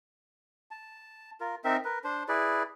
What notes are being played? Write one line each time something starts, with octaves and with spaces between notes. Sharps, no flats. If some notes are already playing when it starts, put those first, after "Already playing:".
A5
F4 A#4
C4 D#4 A#4 E5
A#4 B4
D4 C5
E4 G#4 B4 D5